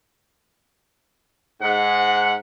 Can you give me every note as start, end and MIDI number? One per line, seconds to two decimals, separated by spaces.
1.61 2.35 44
1.61 2.35 78